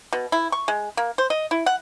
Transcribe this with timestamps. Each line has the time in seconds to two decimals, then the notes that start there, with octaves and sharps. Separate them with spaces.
0.13 B2
0.32 E4
0.52 C#6
0.68 G#3
0.97 A#3
1.18 C5
1.30 D#5
1.51 E4
1.66 F#5